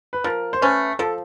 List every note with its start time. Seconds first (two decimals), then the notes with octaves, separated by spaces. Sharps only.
0.13 B4
0.24 F3 A#4
0.53 C5
0.62 A3 C#4 B4
0.99 F3 A4